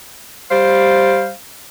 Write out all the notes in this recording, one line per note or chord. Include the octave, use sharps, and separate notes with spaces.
G3 C5 F5